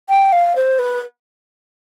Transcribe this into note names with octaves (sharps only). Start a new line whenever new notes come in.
G5
F5
C5
B4